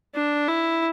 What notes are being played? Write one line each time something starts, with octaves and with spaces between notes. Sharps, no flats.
D4
E4